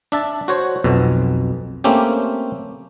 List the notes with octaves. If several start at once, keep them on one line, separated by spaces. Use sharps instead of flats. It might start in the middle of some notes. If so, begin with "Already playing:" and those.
D4 E5 A5
F#4 C5 C#5
B1 F2 B2
A3 A#3 C4 C#4 G4